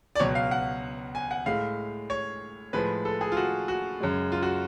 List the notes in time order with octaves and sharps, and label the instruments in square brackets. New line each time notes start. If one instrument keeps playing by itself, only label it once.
[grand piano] D5
C#2 B2 F#3 C#5
F5
F#5
G#5
F#5
A2 G#3 F5
C#5
A2 F3 G#3 B4
A4
G#4
F4
F#4
F#4
F#2 C#3 G#3
F4
F#4